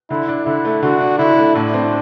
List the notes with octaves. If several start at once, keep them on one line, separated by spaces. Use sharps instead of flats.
D3 E4
D4
D3 E4
A3
D3 F#4
D4
D3 E4
A3
A2 D4
C4